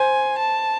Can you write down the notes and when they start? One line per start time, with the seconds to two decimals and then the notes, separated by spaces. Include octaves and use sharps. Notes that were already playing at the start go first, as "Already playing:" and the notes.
Already playing: C5 G#5
0.39 A5